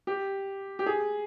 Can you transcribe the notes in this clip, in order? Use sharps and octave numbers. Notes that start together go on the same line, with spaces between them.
G4
G4
G#4